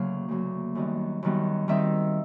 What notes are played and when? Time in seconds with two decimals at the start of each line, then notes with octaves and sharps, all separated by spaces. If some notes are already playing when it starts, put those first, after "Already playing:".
Already playing: D2 C#3 F#3 A#3 F5
0.28 D2 C#3 F#3 A#3
0.75 F#2 D#3 G3 B3
1.23 F#2 D#3 G3 B3
1.68 D#3 G3 C4 D#4 E5